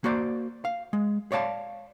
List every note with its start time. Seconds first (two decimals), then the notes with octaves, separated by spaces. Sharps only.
0.04 A#3 F#4 C5 D5
0.65 F5
0.93 G#3
1.32 C#5 D5 F5 A5